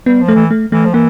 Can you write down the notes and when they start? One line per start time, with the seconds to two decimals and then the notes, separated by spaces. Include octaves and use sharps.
0.06 G3 B3
0.20 F3
0.28 A3
0.35 E3
0.51 A3
0.72 E3 A3
0.85 F3
0.94 E3 A#3